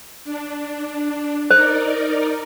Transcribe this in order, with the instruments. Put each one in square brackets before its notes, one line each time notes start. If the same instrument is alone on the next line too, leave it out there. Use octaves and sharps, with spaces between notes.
[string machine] D4
[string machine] D#4 A#4 D5 [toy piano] C5